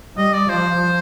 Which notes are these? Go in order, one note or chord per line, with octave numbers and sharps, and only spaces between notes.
G3 D#5
D5
F3 C5